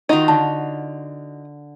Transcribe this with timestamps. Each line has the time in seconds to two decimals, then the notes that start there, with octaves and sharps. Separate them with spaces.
0.09 D#3 D#4 F4 F#4
0.28 D3 A5